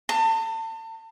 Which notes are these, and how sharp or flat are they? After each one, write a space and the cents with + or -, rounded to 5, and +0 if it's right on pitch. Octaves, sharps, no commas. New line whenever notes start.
A5 +35